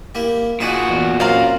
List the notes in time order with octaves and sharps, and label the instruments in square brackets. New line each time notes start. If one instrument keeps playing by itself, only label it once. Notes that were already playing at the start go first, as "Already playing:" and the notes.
[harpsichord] A#3 E4 G4
[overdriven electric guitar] A#2 F#4 [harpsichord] D#4 G#4 D5
[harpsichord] E2
[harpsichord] F#2 C4 [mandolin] D5 F5 A#5